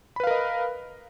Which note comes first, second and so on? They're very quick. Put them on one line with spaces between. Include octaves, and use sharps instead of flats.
B5 B4 F5 A#4 D#5